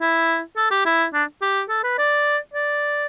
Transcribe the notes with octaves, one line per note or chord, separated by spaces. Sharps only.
E4
A4
G4
E4
D4
G4
A4
B4
D5
D5